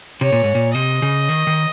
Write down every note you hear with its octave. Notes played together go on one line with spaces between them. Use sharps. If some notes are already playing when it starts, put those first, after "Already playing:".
C3 C#5
A#2
G#2
A#2
C3 D#5
C#3
D#3
D#3